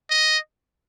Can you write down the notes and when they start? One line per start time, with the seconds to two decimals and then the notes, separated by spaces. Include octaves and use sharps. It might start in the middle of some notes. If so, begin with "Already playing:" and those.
0.10 D#5